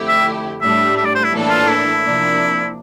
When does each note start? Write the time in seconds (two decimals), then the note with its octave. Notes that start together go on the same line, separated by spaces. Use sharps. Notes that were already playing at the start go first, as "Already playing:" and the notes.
Already playing: F2 D3 A3 E4 G4
0.08 E5
0.61 A2 G3 D4 E5
0.97 E5
1.05 D5
1.15 C5
1.24 E4
1.32 A2 E3 A#3 D4 A4
1.50 F4
1.68 E4
2.03 C3 F3 A#3 D4